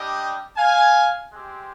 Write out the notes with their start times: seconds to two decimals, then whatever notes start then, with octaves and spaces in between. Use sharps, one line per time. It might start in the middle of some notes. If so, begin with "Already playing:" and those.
Already playing: G3 D4 G4 D#5 G5
0.57 F5 G#5
1.32 G#3 C4 G4